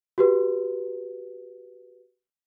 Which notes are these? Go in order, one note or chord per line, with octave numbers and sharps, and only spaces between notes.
F#4 G4 B4